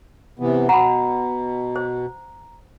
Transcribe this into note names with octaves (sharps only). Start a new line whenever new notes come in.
C3 E3 B3
B2 F#5 A#5 B5
C5